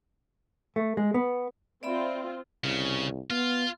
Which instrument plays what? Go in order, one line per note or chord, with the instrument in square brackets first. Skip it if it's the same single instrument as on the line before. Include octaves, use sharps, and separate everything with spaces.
[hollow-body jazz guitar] A3
G#3
B3
[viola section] C4 F4 [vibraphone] D5 E5 B5
[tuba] C2 [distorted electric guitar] C#3
[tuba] B3 [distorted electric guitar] F4